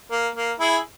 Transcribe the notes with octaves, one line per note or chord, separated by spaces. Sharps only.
A#3
A#3
E4 G#4